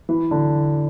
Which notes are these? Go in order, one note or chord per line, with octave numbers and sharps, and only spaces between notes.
E3
D3